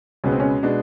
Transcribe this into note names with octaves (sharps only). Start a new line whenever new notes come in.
C#2 B2 G#3 B3 C#4
C4
C#4
B2 G#3 B3 D4